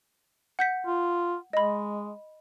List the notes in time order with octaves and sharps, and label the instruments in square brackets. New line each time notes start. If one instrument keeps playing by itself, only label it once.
[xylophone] F#5 G6 B6
[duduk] F4
[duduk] G#3 [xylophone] D#5 B5